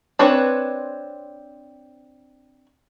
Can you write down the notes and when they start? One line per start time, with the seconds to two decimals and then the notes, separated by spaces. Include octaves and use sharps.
0.19 C4 D4 B4 C#5